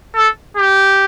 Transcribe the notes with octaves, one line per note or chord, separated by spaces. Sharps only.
A4
G4